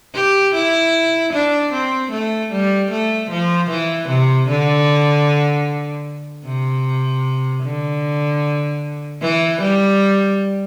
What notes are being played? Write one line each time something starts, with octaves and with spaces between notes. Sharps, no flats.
G4
E4
D4
C4
A3
G3
A3
F3
E3
C3
D3
C3
D3
E3
G3